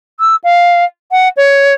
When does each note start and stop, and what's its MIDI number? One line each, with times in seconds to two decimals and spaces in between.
0.20 0.35 88
0.44 0.84 77
1.11 1.28 78
1.37 1.74 73